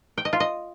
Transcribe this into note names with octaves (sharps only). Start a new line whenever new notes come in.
G5
D#5
F4
D#5